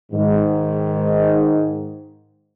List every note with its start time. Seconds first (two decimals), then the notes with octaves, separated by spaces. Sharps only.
0.12 G#2 D#3